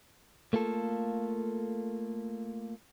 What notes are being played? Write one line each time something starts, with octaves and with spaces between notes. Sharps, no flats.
A3 A#3 F4 A4